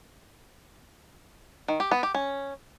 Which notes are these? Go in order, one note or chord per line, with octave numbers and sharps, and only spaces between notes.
D#3
G4
B3
G4
C#4